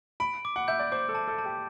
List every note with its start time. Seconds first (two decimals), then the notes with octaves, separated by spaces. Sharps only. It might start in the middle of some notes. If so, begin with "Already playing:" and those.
0.20 B5 D7
0.45 D6
0.56 F#5
0.68 E5 G6
0.79 D5
0.92 C5 D6
1.09 A4
1.15 A5
1.28 A4
1.38 A5
1.45 G4